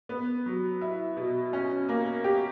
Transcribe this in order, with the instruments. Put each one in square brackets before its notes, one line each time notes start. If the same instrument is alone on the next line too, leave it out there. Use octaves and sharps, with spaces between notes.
[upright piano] B3
F#3
E4
B2
C#4
A#3
G4